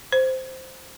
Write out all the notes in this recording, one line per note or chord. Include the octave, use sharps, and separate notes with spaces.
C5